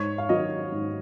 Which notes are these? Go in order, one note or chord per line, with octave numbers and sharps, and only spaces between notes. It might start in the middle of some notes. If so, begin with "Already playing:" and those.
Already playing: G#2 C#5
F5
D#3 F#3 D#5
G#2